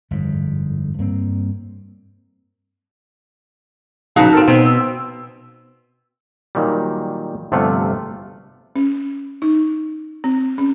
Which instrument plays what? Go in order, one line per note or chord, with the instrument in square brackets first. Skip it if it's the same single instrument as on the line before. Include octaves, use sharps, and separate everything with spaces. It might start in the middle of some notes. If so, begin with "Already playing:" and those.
[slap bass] G1 F2 G#2
G2 A#3 C4
[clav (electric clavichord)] A#1 C#3 B4 [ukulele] D#4 F#4 F5 [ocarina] A5
[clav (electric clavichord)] C4 A4 A#4
[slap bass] B2 [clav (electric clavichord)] C4 [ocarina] C5
[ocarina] E6
[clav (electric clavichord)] A#2 D#3 F#3 G3
G1 C3 F3 A3 F4 F#5
[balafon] C#4
D#4
C4
C#4